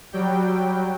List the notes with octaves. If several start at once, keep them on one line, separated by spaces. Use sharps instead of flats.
F#3 G3 G5